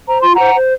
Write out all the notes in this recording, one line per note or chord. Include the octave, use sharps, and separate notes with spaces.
C5 A#5
F4 C6
C5 F#5 A#5
C5